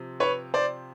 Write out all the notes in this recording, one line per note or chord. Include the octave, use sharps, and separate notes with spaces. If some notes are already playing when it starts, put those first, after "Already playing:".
Already playing: C3 F3
B4 C#5
C5 D5